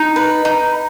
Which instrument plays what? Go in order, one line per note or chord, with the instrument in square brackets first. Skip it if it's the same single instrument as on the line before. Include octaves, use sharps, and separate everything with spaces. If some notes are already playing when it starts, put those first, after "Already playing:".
Already playing: [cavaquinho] D#4
B4
D#4